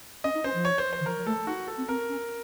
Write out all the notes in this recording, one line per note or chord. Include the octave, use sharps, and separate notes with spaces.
C#4 D#5
D#4
C#4 C5
F3
C#5
C5
C5
D#3
F3 A#4
F#3
A3 A4
D#4 F#4
A4
C4
C4 A#4
C#4